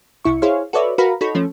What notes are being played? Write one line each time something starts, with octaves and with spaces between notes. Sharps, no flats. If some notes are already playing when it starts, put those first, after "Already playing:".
C2 E4 C#6
E4 G#4 C5 C#5 F5
F#4 A4 B4 C#5 D5 E5
F#4 A#4 B4 F5 A#5 B5
D#4 F#4 A4 C#5 B5
F3 A3 C#4